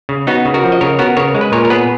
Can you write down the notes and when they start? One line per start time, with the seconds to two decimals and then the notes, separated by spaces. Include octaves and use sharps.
0.09 C#3
0.27 B3 D#4 F#4
0.45 C#3
0.54 F#4 A#4
0.63 F3
0.72 D#5
0.81 C#3 A#4 C#5
0.99 B3 F#4 A#4
1.17 C#3 A#4 C#5
1.34 G#3
1.41 B4
1.52 A#2 A#4 C#5
1.65 A#4
1.70 B3 G#4 B4